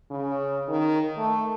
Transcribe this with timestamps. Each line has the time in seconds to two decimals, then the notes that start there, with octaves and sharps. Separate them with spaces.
0.11 C#3
0.68 D#3
1.18 A3